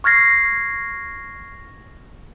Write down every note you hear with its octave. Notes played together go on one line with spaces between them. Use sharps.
C#6 F6 G#6 A#6 C7